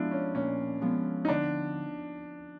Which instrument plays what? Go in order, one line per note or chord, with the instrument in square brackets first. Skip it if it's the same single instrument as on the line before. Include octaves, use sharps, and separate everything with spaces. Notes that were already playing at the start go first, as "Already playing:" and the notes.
Already playing: [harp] F3 G#3 B3 [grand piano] D4 E4 F4
[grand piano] C#4
[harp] A#2 [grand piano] C#4
[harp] F3 G#3 B3
[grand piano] D#4
[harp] D3 [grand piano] D4